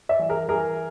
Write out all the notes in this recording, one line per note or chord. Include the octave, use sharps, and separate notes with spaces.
D5 E5
E3
G#4 A#4
E3 G#4 A#4